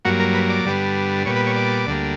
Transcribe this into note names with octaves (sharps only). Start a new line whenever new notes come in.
G2 F#3 A#3 F#4
A#4
B4
D5
G2 D3 G3 B3
A#2 G3 B3 C#5
B4
C#5
D5
D2 D3 G3 A#3